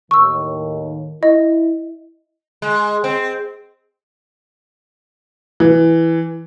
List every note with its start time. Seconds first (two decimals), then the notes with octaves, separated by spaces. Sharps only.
0.11 D#2 A2 D#3 C#6 E6
1.23 E4 D#5
2.62 G#3
3.04 C4
5.60 E3